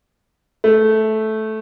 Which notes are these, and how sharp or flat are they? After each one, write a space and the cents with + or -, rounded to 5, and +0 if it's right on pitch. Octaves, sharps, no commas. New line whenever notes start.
A3 -10